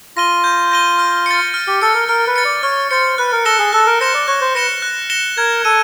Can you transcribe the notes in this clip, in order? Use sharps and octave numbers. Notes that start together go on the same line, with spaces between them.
F4 A#6 D#7 G7
G6
A#6 D#7 G7
F6
A6 C#7
F6
G4
A4 A6 C#7
A#4
A#4 F6
B4
A6 C#7
D5
C#5 F6
C5 A6 C#7
B4 F#6
A#4
A4 A#6 C#7 E7 G7
G#4
A4 F#6
A#4
C5 A#6 C#7 E7 G7
D5
C#5 F#6
C5
B4 A#6 C#7 E7 G7
F#6
A#6 C#7 E7 G7
A#4 G#6
A4 D#7